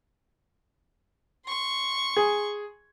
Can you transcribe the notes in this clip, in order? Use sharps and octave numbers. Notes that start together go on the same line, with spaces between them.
C6 C#6
G#4